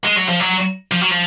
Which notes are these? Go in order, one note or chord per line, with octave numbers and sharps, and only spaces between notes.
G#3
F#3
F3
F#3
F3
F#3
F3